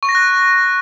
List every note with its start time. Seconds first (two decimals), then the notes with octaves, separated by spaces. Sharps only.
0.03 C#6
0.09 A#6
0.15 F#6